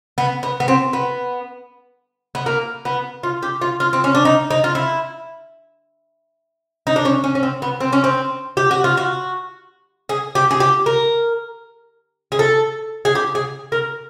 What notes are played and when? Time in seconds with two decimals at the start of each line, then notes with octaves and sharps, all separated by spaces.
0.18 B3
0.43 B3
0.60 B3
0.68 C4
0.93 B3
2.35 B3
2.46 A#3
2.85 B3
3.23 F4
3.43 G4
3.61 F4
3.80 F4
3.93 C4
4.04 C#4
4.15 D4
4.25 D#4
4.51 D#4
4.64 F4
4.75 E4
6.87 D#4
6.96 D4
7.05 C#4
7.24 C#4
7.35 C#4
7.43 C4
7.62 B3
7.80 C4
7.93 C#4
8.04 C4
8.57 G4
8.71 F#4
8.84 F4
8.97 F#4
10.09 G#4
10.35 G4
10.51 G#4
10.60 G4
10.86 A#4
12.32 G#4
12.39 A4
13.05 G#4
13.15 G4
13.35 G#4
13.72 A#4